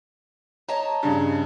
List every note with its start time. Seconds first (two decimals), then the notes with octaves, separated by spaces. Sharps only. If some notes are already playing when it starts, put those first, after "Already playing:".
0.68 C#5 D#5 A5 A#5
1.03 G2 C#3